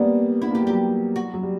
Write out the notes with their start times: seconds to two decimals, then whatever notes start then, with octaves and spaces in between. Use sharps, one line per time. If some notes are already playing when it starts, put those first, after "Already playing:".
Already playing: G3 A#3 B3 D4
0.42 B3 E4
0.51 A#3
0.55 G4
0.61 G3
0.67 F#3 G4
1.16 F#4
1.34 F#3
1.43 G3